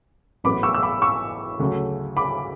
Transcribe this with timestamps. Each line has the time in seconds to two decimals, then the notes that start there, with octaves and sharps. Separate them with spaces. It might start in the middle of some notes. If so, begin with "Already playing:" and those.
0.44 A1 A2 F#3 B3 B5 D6
0.63 C#6 E6
0.75 E6
0.82 B5 D6
1.02 C#6 E6
1.59 D2 C#3 F#3 A3
2.17 B5 D6